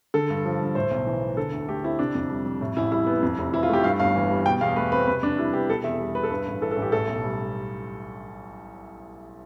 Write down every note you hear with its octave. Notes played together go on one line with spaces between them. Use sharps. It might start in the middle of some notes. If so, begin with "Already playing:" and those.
D3 A4
G2
F3
G2
A2 C5
B1
E3
B3
D3 A4
D2
A3 G4
C4 E4
C3 D4
F2
G3
F2
A2
A1 E4
G3 E4
B3
F2
F1
E3 E4
F4
A3 G4
G2 F5
G1 F5
E3
G3
B2 G5
E2 F5
A3 B4
C4 B4
C3 B4
F2 D4
G3 E4
B3 G4
B2 A4
E2 E5
G3
B3 B4
A4
G2 B4
A1
E3 A4
A4
A1
G4
A2 A4
B1
G3